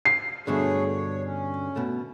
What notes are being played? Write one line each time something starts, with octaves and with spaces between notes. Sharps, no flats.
C7
G2 B2 D3 A3 G#4 C#5
C#5
C#4
B2 A3